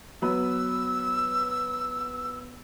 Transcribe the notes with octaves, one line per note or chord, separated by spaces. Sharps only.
F#3 B3 B4 E6